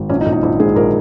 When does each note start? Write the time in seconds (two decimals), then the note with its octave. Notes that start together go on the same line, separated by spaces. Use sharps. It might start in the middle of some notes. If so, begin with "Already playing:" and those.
Already playing: G#1
0.09 A#1 C#4
0.21 D#4
0.26 A#1
0.32 D#4
0.43 A#1 E4
0.60 G#2 G#4
0.76 A#1 A#4